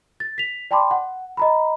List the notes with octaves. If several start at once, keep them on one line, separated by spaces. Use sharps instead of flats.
A6
B6 F7
D5 G5 A5 B5 C6 D6
F#5
D#5 A#5 B5